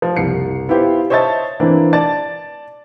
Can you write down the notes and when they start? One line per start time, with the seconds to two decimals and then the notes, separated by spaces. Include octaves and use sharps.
0.02 F3
0.16 F#1 C2 C7 C#7
0.68 B3 E4 F4 G4 C5
1.10 C5 C#5 D#5 E5 A5 A6
1.60 E3 A#3 C4 D4 E4
1.93 D5 A5 A6